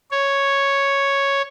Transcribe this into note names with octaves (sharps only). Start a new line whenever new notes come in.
C#5